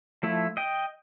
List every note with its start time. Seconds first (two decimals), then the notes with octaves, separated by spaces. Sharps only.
0.23 F3 A3 E4
0.57 D#5 G5